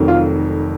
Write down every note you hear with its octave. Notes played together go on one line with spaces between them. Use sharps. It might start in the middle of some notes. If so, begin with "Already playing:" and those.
Already playing: F1 F2 D#3 F#3
F4